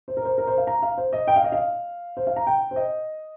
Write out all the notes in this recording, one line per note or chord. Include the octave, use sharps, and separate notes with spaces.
C5
A#4
C5
A#4
C5
F5
A#5
F5
C5
D#5
G5
F5
D#5
F5
C5
F5
A#5
G5
C5
D#5